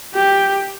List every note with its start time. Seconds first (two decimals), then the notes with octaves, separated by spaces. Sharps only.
0.14 G4